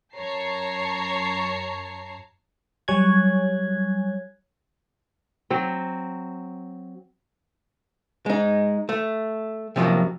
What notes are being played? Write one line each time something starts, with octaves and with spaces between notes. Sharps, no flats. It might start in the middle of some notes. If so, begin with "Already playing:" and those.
F#2 C#5 A5 A#5 C7
F#3 G3 C#5 G#5 F#6 G#6
F#3 C4
G#3 D#4
A3
C3 F3 F#3 A#3